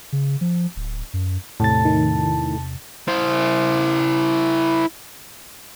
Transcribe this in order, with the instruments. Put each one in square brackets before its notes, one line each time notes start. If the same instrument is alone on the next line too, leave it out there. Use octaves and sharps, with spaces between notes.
[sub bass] C#3
F3
D1
F#2
[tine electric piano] E2 C3 A6 [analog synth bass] A2 [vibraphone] A5
[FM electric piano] D#3
[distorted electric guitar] E4 C5